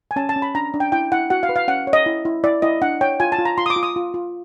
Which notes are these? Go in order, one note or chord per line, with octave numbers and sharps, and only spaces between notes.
G#5
C#4 A5
A5
C#4
B5
D4 A#5
D4
G5
E4 G5
E4 F#5
F#4 F#5
F5
B4
F5
C#4 F#5
C#5
D#5
E4
E4
E4 D5
E4 D#5
D4 F#5
C#5 G5
F4 G#5
A5
F4
A#5
F4 C6
D#6
D6
F4
D#6
F4
F4